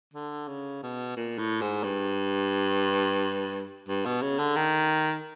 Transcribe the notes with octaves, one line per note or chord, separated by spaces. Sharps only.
D3
C#3
B2
A#2
A2
G#2
G2
G2
B2
C#3
D3
D#3